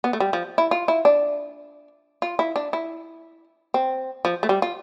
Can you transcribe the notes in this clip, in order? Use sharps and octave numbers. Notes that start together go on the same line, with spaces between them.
B3
A3
G3
F3
E4
F4
E4
D4
F4
E4
D4
E4
C4
F3
A3
G3
F4